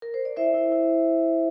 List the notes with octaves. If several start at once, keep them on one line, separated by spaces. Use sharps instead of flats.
A#4
C5
D5
E4 C5 E5
E4
E4